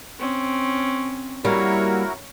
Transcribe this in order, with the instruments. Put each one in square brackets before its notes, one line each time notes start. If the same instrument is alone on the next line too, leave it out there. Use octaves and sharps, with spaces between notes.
[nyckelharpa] C4 C#4
[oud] G3 A#3 [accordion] E4 F#4 A#4 [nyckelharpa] C#5